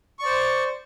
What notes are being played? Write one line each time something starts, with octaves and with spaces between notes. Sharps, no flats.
C5 D5 C#6